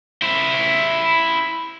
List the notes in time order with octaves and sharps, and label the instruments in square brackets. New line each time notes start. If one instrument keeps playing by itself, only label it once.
[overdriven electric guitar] E4 C5